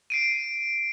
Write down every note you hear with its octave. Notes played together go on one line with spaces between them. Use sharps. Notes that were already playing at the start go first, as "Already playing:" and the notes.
C7 D7 D#7